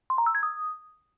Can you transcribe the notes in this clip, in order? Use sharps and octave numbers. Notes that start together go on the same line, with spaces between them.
C6
A#5
E6
G#6
D#6